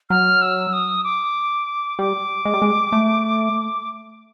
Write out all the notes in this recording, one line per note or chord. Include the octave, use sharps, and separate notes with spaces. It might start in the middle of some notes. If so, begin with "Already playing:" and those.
F#3 F6
E6
D#6
D6
G3 D6
G#3
G3
G#3
A3